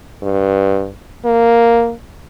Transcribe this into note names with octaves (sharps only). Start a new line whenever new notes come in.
G2
A#3